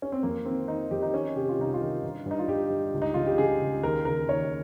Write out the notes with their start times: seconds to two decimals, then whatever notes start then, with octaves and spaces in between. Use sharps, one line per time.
0.02 C#4
0.12 C4
0.23 F2 A#3
0.45 D#3 C4
0.68 D#3 D#4
0.91 F2 G4
1.02 D#4
1.13 D#3 C#4
1.36 C3 G4
1.49 F4
1.59 C2 D#4
1.74 F4
1.81 D#3
2.03 G2
2.26 G2
2.31 D#4
2.39 F4
2.48 G2 G4
2.70 G2
2.94 C#2
3.02 D#4
3.14 C#3 F4
3.26 G4
3.38 C#3 G#4
3.61 C#2
3.83 D#2 A#4
4.05 C#3 A#4
4.28 D#2 C#5